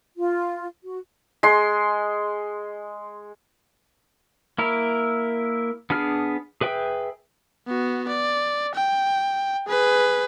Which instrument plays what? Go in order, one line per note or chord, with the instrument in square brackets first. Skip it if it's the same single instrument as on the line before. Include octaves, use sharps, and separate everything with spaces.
[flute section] F4
F#4
[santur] G#3 C6
[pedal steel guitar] A#3 E4 A#4
B3 D4 G#4 F6
G#4 B4 E5 G5
[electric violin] B3 F#4
D5
G5
G#4 B4